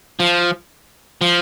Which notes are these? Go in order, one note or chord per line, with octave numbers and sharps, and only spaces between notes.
F3
F3